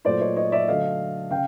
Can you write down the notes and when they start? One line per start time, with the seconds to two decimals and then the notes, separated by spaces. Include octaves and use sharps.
0.05 A#2 F#3 A3 C5 D5
0.20 C#5 D#5
0.36 C#5 D#5
0.52 D5 E5
0.68 D3 F#3 A3 D#5 F5
1.31 C#3 F5 G5